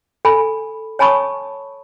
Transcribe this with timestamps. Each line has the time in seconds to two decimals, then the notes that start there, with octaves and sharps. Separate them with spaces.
0.25 A4 G#5 B5
0.99 C#5 G#5 A5 B5 C#6 D#6